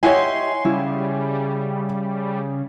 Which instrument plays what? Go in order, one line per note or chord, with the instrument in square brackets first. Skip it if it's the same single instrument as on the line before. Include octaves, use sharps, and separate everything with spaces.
[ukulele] E4 G4 D#5 [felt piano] C#5 F#5 G#5 [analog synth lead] C6
[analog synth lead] C#3 [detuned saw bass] G3 [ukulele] E4